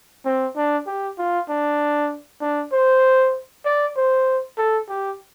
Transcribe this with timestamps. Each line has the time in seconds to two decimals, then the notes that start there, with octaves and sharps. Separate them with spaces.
0.25 C4
0.56 D4
0.87 G4
1.19 F4
1.49 D4
2.41 D4
2.73 C5
3.65 D5
3.96 C5
4.58 A4
4.89 G4